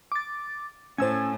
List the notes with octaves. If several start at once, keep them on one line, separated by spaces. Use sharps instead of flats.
D6 A6
A2 C#4 C5 A5 E6 G#6